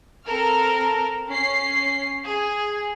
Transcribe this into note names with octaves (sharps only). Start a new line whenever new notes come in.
C4 A4 A#4 F6
C#4 C7
G#4